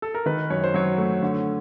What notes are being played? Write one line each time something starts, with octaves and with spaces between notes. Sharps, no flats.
A4
A#4
D#3 B4
F#2 C#5
C5
F#3 C#5
A3
D3